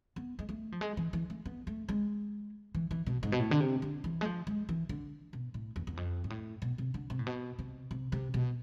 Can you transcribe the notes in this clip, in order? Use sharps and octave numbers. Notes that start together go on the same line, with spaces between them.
B3
G#3
A3
F3
G#3
E3
E3
A3
B3
A3
G#3
E3
E3
B2
G#2
B2
A2
D3
C3
D3
E3
G#3
F3
G#3
E3
D3
B2
A2
E2
E2
F2
G#2
A2
B2
C3
D3
C3
A2
B2
C3
C3
C3
B2